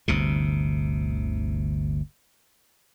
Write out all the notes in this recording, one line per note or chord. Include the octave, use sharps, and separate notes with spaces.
G1 D2 C3